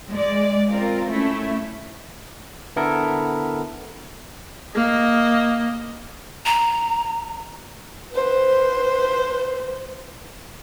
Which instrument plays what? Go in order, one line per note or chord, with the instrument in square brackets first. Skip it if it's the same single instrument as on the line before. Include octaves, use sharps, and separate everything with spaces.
[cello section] G#3 D5
C4 F4 A#4
A3 C#4 E4
[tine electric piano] D3 B3 E4 A4 A#4
[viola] A#3 D#5
[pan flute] A#5
[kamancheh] B4 C5